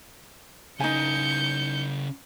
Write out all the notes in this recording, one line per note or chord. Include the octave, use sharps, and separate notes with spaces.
C#3 D#4 A#4 G#5 G6 C#7